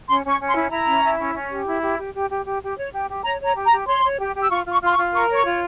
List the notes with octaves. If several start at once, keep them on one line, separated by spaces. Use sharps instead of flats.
C#4 C6
C#4 C#6
C#4
C6
E4
E4 A#5
C#4
E4
C#4
C#4
G4
E4
G4
G4
G4
G4
G4
G4
C#5
G4
G4
C#5 A#5
C#5 A#5
G4
A#5
G4
C#5 C6
C#5
G4
G4
E6
F4 C#6
F4
C#6
F4 C6
C#6
F4
A#4 C#6
C#5
C#6
F4